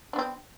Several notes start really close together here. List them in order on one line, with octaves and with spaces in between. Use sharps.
D4 B3 C4